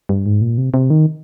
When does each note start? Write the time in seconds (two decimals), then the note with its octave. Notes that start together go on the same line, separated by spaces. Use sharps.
0.09 G2
0.26 G#2
0.41 A#2
0.58 C3
0.74 C3
0.90 D#3